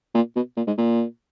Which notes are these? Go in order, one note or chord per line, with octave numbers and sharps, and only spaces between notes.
A#2
B2
A#2
G#2
A#2